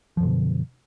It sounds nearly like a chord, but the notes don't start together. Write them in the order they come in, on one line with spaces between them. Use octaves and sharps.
F3 F#2 D3 B2